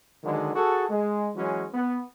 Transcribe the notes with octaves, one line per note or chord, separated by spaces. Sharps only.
D3 D#3 F#3 G#3
F#4 G#4 A4
G#3
E3 F#3 G#3 C#4
B3